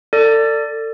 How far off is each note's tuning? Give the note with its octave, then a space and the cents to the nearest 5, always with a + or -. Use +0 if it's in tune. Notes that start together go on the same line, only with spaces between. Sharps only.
A4 +35 D5 +0